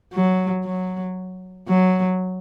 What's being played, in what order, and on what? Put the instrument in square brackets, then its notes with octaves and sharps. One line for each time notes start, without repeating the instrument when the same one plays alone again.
[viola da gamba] F#3
F#3
F#3